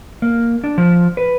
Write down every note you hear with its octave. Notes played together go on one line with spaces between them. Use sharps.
A#3
D4
F3
B4